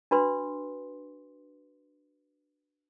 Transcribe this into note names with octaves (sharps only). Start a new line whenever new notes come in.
D4 F#4 B4 C6